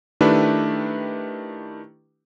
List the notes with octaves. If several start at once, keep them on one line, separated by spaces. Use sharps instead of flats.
D#3 A3 D4 E4 G4 B4